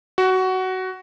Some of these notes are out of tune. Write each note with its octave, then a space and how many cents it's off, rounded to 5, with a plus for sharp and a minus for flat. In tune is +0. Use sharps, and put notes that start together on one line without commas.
F#4 +15